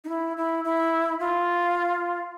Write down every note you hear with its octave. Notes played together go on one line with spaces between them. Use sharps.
D#4
E4
E4
E4
F4